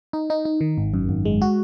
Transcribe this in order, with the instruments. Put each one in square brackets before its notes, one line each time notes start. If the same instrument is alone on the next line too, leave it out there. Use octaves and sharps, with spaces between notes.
[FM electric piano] D#4
D#4
D#4
D#3
G#1
F#2
G#1
G#3
F#4